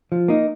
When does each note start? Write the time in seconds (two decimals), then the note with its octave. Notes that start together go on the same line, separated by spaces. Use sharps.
0.12 F3
0.28 A#3 D#4